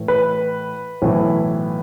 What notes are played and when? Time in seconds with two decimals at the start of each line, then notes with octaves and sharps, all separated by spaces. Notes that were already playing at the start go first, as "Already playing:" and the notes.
Already playing: A2 E3
0.08 B4
1.02 B1 A2 E3